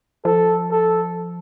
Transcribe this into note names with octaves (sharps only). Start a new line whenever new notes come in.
F3 A4
A4